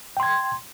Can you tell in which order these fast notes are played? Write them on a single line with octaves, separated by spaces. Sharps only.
G5 C6 G#6